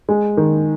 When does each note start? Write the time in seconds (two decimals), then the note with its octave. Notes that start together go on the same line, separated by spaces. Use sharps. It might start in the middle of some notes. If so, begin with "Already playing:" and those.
0.09 G#3
0.37 D#3